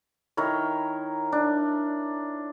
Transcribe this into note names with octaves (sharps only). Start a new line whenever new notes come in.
D#3 E4 A#4 C#5
D4